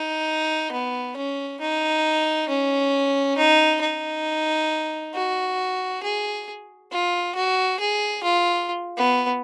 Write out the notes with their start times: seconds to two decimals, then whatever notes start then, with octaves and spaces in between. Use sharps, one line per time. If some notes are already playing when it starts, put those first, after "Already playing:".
Already playing: D#4
0.72 B3
1.16 C#4
1.61 D#4
2.49 C#4
3.38 D#4
3.81 D#4
5.15 F#4
6.03 G#4
6.92 F4
7.36 F#4
7.80 G#4
8.24 F4
8.98 B3